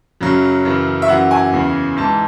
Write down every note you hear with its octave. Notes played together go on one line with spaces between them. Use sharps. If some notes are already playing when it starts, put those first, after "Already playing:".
F#2 C#3 F#3
F#2 C#3 E3
E5
F#2 E3 F#5
G#5
E2 C#3 E3
G#2 E3 A5